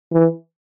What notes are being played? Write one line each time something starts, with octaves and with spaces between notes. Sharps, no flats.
E3